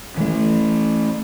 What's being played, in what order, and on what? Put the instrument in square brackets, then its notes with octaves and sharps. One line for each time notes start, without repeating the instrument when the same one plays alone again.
[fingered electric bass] E3 A3